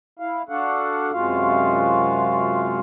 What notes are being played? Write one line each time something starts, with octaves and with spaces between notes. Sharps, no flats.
E4 F5
D4 F#4 A4 F5 F#5
F#2 C3 G#3 F4 F#4 F5